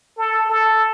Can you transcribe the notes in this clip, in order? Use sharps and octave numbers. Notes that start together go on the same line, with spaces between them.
A4
A4